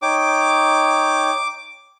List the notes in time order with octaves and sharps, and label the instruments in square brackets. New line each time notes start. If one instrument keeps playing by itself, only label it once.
[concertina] D#4 C#5 G5 [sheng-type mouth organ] D6